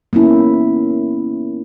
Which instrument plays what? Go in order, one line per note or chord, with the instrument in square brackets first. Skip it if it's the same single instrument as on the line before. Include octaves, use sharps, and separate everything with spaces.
[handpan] A#3 B3 C#4 E4